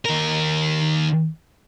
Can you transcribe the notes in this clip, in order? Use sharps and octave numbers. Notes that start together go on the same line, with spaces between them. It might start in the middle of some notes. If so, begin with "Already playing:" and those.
D#2 A#4